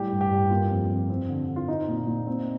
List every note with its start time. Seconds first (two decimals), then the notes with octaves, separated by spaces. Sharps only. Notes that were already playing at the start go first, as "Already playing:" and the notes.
Already playing: A2 G3 G4
0.12 G2
0.21 G4
0.31 G2
0.50 A#3 F4
0.70 F2
0.90 F2
1.10 C4
1.29 D3
1.48 D3
1.56 F4
1.68 C4 D#4
1.88 A#2
2.07 A#2
2.27 C4